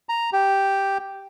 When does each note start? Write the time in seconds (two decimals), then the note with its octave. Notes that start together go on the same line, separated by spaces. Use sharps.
0.09 A#5
0.33 G4